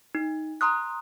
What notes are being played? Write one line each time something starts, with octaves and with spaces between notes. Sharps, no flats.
D#4
A#5 C6 D#6 F#6